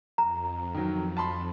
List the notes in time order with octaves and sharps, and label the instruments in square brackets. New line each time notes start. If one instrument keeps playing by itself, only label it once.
[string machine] F2 [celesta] A#5
[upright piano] D#3 F#3
A5 B5 C6